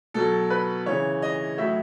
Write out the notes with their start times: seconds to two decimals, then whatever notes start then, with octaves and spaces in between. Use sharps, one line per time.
0.14 B2 F#3 A4
0.50 B4
0.86 C#3 E3 C#5
1.22 D#5
1.58 A2 F#3 E5